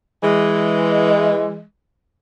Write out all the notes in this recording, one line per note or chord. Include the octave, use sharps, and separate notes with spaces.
E3 G#3